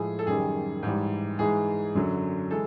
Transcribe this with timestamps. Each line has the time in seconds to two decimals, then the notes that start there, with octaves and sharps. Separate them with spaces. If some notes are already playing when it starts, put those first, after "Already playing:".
Already playing: A2 F3 G#3 G#4
0.19 A4
0.27 F#2 D#3 G3 G#4
0.83 G#2 E3 G3
1.39 G#2 E3 G#3 G#4
1.95 F#2 D3 F#3
2.51 E3 G#3 A4